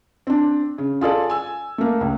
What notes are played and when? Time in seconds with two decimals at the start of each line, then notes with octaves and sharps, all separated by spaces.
0.27 C4 D4
0.78 C#3
1.01 F4 G#4 A4 D5
1.29 G#5 E6
1.78 A3 A#3
2.01 C#2